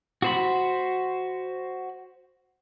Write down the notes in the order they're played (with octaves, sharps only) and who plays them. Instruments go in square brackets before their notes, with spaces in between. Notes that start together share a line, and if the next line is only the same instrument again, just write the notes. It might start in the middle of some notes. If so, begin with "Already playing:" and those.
[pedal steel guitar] F#4 C5 B5